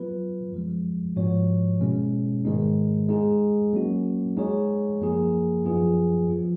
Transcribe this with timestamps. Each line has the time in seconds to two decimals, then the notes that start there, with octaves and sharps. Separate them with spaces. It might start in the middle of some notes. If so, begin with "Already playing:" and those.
Already playing: F#3 B3 F4 B4
0.52 F#2 F3 G#3
1.16 G#2 F3 B3 F#4 C#5
1.81 B2 G#3 C#4
2.45 G#2 D#3 G#3 B3 D#4
3.09 G#3 D#4 G#4
3.73 F#3 A#3 C#4 F#4
4.37 G#3 D#4 G#4 C#5
5.01 F#2 F3 A#3 D#4 G#4
5.65 F#2 F3 B3 F4 G#4
6.29 F3 B3 F4